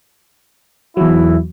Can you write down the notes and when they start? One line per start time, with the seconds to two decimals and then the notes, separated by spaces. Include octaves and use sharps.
0.97 E2 F#3 E4